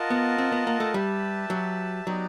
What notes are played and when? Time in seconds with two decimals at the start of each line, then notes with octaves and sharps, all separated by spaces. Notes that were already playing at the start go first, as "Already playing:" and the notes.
Already playing: F4 A#4 D#5 F#5 A5
0.10 B3
0.38 C4
0.52 B3
0.67 A#3
0.80 A3
0.94 G3 G4 B4 E5 A5
1.50 F#3
2.06 F#3 B3 D#4 G4 B4 D5